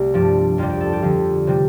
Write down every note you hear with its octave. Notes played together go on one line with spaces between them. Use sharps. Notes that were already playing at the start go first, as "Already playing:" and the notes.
Already playing: C2 A3 C4
G2 F3 D4
F2 C3 G3 F4
G4
A4
G4
F2 D3 F3 F4
C3 G3 C4